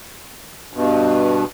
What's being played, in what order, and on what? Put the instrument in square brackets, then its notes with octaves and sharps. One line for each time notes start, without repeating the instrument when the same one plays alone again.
[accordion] G2 B2